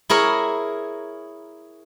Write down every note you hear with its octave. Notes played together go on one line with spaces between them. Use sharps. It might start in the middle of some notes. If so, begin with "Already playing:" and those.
E4 G#4 A#4 C#5